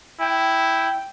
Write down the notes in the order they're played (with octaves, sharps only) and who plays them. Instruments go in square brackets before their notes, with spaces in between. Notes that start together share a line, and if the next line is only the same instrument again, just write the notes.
[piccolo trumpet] E4 [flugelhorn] G5